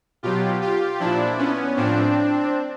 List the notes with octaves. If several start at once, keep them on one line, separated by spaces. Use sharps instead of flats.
B2 F#3 F4 G4
F4 G4
A#2 F3 D4 E4
B3 C#4
A2 F3 C4 D4